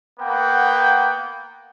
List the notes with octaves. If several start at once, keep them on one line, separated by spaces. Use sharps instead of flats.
A#3 B3 F#5 G5